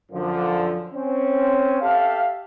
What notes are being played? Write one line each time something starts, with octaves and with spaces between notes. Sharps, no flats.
F#2 D3 F3
C4 C#4
G4 A4 E5 F5